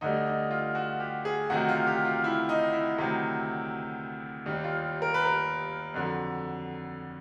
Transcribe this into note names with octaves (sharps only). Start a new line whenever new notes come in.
D2 D3 G3 D#4
D#4
F4
F#4
G4
G#4
D2 C3 D#3 F#3 F#4
F4
G4
F4
E4
D#4
E4
D2 C3 D#3 F#3
D#2 D#3 G3
F4
A#4
B4
A#4
F2 D3 F#3